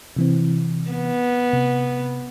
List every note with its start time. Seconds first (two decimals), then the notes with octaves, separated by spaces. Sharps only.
0.16 C3 E3 C4
0.91 B3
1.53 C3